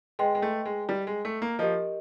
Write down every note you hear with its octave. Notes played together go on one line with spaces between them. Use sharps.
G#3 B4 D#5 G5 C6
G#3
A3
G#3
G3
G#3
A3
A#3
F3 G4 A#4 D#5